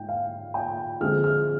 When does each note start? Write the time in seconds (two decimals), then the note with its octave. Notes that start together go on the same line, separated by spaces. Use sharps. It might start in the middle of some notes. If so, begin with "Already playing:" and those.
Already playing: G#2 G5
0.09 F5
0.54 G5
1.00 D3 F3 G#3 C4 F6
1.24 F6